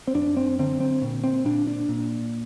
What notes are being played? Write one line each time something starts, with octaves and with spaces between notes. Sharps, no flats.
C4
F#2 D4
C4
D3 C4
C4
A#2
C4
A#2 D4
D4
A#2